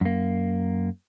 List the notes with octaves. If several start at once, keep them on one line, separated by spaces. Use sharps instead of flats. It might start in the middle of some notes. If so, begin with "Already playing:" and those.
F#2 A#3